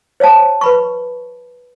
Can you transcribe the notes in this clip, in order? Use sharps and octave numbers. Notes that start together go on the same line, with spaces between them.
C5 C#5 F5 A5
B4 B5 C#6